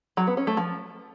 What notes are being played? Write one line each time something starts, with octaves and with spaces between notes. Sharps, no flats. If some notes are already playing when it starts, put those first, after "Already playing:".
F#3
B3
C#4
A3
F3